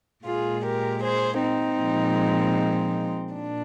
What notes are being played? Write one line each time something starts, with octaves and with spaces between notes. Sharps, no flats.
A#2 G#3 F4 G#4
G4 A#4
G#4 C5
C4 D#4
A#2 F3 G#3
A#2 D4